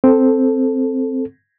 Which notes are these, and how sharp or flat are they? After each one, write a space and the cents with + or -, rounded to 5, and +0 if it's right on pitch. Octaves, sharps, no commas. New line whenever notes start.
C4 +0 A4 +0